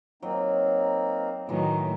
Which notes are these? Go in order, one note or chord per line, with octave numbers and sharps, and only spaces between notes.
F#3 A#3 C4 D#4
A2 D#3 E3 F#3 D#4